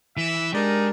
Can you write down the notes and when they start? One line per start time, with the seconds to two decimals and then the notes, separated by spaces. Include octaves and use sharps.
0.17 E3 E5
0.54 G#3 D4 D#4 G4 A#4